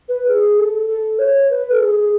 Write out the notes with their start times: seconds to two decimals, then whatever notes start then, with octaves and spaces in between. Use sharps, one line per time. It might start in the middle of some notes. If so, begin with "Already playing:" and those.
0.09 B4
0.28 G#4
0.59 A4
0.89 A4
1.19 C#5
1.50 B4
1.72 A4
1.80 G#4